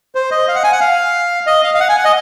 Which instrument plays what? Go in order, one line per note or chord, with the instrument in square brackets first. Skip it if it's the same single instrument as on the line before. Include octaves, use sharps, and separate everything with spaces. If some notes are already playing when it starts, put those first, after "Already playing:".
[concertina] C5
D#5
F5
F#5
G#5
F#5
F5
D#5
F5
F5
F#5
G#5
F#5
D#5